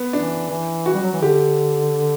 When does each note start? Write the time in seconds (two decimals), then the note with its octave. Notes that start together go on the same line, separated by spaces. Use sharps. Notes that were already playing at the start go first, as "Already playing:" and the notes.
Already playing: B3
0.13 E3 D4
0.50 E3
0.86 F#4
0.94 G3
1.03 F#3
1.13 E3
1.22 D3 G4